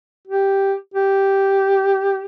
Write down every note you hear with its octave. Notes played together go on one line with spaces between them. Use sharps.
G4
G4